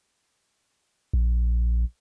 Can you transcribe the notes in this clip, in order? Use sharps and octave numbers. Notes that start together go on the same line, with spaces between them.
A#1